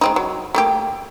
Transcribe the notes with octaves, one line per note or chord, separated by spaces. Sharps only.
G#3 C4 D#4
F#3
A3 A#3 G4